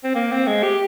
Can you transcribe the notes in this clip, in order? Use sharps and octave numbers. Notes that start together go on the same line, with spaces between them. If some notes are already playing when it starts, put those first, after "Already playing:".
C4
A#3
C4
G#3
G4